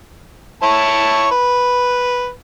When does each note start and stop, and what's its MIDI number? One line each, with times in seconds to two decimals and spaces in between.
0.63 1.28 64
0.63 1.28 73
0.63 1.28 81
1.31 2.29 71